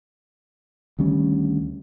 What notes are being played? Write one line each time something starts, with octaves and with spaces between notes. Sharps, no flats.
D2 D#3 G3 C#4